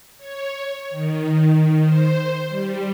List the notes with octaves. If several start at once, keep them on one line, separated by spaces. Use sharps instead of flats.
C#5
D#3
C5
G3